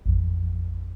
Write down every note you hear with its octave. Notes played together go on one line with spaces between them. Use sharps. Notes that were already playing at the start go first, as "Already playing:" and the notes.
A1 F2